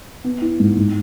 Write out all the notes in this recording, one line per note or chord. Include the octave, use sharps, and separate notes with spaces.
B3
E4
G#2
G#2